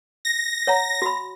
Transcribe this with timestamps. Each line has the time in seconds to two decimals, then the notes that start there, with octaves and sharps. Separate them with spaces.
0.25 A#6
0.67 C#5 F#5 A#5
1.02 F#4 B5